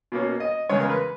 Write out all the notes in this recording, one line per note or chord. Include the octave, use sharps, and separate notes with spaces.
B2 A#3 C#4
D#5
E2 C#3 G#3 C#5
A#4
B4